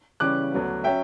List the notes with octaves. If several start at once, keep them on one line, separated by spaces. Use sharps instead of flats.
C#3 E3 G3 C#4 D6 F#6
D2 D3 F#3 B3
F#3 C#4 E5 G5